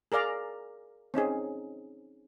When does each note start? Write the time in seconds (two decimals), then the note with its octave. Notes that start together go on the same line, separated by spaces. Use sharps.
0.12 G#4 A#4 D5 F5 A#5
1.14 C4 C#4 D#4 G#4